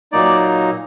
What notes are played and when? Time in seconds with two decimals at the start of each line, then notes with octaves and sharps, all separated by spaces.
0.12 A#2 F#3 A#3 D#4 D5